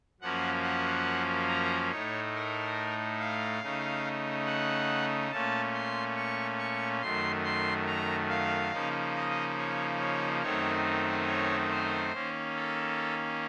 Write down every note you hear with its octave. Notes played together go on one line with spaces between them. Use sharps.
F#2 F3 A#3 C#4 F#5
F#5
A#5
A2 A3 D#4 C#5
A#4
F5
C#3 A3 D#4
F#5
A#2 A3 C#4 A5
C6
C#6
C#6
F#2 D#3 A3 C6
C6
A#5
F5
C#3 F3 A#3 D#4
D#5
C#5
C#5
F#2 D#3 A3 C4 D#4 C#5
C#5
C5
D#3 A#3 C#4
A4